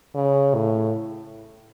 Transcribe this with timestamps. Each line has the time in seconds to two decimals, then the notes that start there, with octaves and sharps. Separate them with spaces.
0.15 C#3
0.54 A2